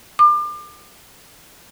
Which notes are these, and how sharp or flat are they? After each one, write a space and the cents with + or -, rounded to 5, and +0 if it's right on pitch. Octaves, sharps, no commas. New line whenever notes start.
D6 +35